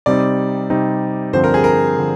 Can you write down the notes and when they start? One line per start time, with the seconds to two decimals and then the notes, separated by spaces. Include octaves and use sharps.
0.06 C3 G3 C4 D#4 D5
0.70 C3 G3 C4 D#4
1.33 G2 D3 F3 C4 C5
1.44 A#4
1.54 G#4
1.64 A#4
1.99 D3 F3